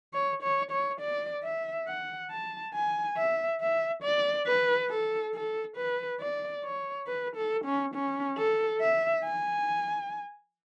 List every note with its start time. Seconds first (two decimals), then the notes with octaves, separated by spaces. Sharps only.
0.13 C#5
0.43 C#5
0.71 C#5
1.00 D5
1.44 E5
1.87 F#5
2.30 A5
2.74 G#5
3.17 E5
3.61 E5
4.03 D5
4.46 B4
4.90 A4
5.34 A4
5.77 B4
6.20 D5
6.64 C#5
7.07 B4
7.36 A4
7.65 C#4
7.94 C#4
8.37 A4
8.81 E5
9.24 G#5